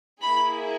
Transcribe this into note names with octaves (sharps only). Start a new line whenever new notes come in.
A#3 E4 G#4 B5